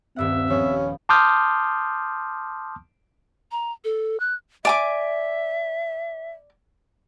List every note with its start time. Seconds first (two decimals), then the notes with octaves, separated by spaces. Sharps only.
0.16 D#1 G2 C4 E5 F#5
0.50 F3 B3 C#4
1.09 A5 C6 D6 D#6 F6 G6
3.52 A#5
3.85 A4
4.20 F#6
4.65 D5 E5 G#5 D6